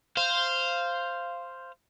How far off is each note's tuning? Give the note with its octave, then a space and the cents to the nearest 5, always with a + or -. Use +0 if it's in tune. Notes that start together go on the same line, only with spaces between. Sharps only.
C5 +0 F5 -10